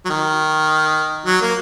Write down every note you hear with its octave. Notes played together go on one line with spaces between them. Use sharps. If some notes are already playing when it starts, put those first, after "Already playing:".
F#3
D#3
F#3
A#3